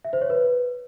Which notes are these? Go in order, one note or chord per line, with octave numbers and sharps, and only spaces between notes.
E5
C5
C#5
B4